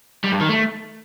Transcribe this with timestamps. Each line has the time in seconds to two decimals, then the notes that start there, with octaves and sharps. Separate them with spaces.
0.24 G3
0.32 G2
0.40 D#3
0.49 A3